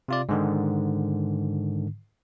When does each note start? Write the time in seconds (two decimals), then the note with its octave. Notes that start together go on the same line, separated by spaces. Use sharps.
0.08 C3 F4 D5
0.29 G#2 D3 D#3